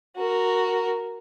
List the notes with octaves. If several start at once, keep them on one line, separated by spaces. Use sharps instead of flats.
F#4 A#4